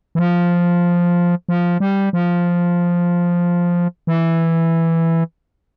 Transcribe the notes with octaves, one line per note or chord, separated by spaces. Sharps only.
E3
F3
F3
G3
F3
E3